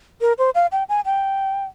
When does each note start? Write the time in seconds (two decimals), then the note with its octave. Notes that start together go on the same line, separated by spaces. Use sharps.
0.21 A#4
0.38 C5
0.55 F5
0.72 G5
0.89 G#5
1.05 G5